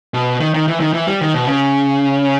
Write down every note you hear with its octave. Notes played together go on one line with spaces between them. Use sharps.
B2
D#3
D#3
E3
D#3
E3
G3
D#3
B2
C#3